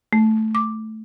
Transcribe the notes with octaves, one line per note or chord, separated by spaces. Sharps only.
A3
D6